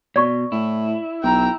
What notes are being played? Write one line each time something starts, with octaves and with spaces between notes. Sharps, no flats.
B2 D5 C#6
A2 E4
B1 G5 A#5